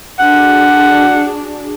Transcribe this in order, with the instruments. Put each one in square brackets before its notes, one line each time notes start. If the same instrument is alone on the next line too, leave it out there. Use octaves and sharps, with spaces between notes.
[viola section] D4 F#4 G#4 [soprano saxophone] F#5